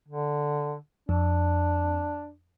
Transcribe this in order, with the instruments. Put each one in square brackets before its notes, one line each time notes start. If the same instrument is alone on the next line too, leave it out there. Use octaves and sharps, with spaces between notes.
[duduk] D3
[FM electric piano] F2 [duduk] D4